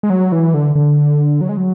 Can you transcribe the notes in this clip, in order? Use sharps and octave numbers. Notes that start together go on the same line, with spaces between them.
G#3
F#3
E3
D3
D3
F#3
G#3
F#3